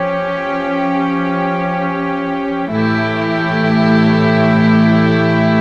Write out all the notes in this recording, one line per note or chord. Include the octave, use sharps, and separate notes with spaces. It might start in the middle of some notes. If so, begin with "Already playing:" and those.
Already playing: F3 C#4 G4
A2 E3 A3 E4 G4